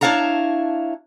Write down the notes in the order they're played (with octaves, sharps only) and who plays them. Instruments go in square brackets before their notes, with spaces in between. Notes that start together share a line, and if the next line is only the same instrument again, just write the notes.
[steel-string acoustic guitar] D4 E4 C#5 F5 A5 A#5